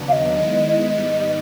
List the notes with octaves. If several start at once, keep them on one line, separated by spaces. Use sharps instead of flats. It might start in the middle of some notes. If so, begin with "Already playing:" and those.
Already playing: D#2 C#3 F#3 B3 D4
F5
D#5
D#3 G#3 B3 E4
D#5
G#2 D#3 G3 B3
D#5